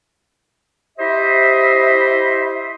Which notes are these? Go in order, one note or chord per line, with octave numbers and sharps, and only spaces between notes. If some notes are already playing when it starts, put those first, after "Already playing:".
E4 G4 C5 D#5 E5